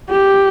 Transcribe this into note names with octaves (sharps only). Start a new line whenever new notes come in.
G4